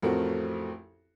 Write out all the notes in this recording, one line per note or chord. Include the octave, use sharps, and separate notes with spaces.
A1 F2 A3 C4 F#4 A#4